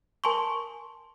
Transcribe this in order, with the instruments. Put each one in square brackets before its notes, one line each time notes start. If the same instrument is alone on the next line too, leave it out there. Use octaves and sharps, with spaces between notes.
[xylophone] A#4 G#5 A5 C6 C#6